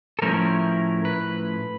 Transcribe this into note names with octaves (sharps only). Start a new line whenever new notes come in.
A4
A2 F3 A3 C#4 E4 A#4
B4